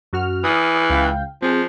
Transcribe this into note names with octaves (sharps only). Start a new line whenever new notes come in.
F#2 F#4 F6
E3 D#6
C#2 F5 G5
F3 C4 G#4